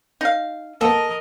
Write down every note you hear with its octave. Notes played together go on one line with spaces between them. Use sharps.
D#4 F5
A#3 B3 A4 A#4 D#5